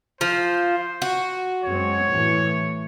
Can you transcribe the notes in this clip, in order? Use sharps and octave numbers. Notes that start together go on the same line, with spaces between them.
F3 C5
F#4
F#2 G#3 C4 C#5
A2 E3 A3